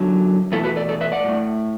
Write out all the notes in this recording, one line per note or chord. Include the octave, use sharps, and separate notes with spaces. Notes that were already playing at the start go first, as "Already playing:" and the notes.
Already playing: F#2 D3 F#3
E2 B2 A3 E4 A4
F#4 B4
A4 D5
A4 D5
B4 E5
D5 F#5
A2 A3